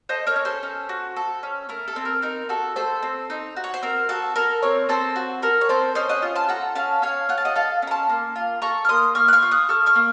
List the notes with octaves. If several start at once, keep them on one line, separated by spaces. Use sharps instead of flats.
A4 C5 D#5
A#4 C#5
C#4
A4 C5
C#4
F#4
A4
C#4
A3 A#4
A4
C4
A#4
D#4 A#4
F#4 A4
A3 A4 C5
C4
D#4
F#4
C#5
C5
C4 A#4
F#4 A4
A4 A#4
C4 A#4 C#5
C4 A4 C5
F#4
A4 A#4
C#5
C4 A4 C5
C#4 C5 D#5
D#5 F#5
F4
A5 C6
A4 F#5 A#5
C#4 F5 A5
C#4 C#5 F5
F4 F#5
A5
D#5 F#5
A4 F5 A5
C#4 A#5
A5 C6
A#3
F4
A4 A#5 C#6
F6
A#3 C6 D#6
A#3 C#6 F6
F#6
C#6 F6
F4
D#6 F#6
A4 C#6 F6
C#6 F6
A#3